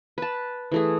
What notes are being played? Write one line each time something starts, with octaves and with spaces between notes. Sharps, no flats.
B4 A5
E3 A3 G#4